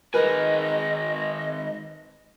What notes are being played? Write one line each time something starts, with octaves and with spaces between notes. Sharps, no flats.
D#3 G#3 A#4 B4 D#5 G#5